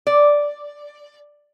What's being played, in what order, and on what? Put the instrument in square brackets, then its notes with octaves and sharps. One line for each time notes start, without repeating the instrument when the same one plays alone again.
[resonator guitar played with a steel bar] D5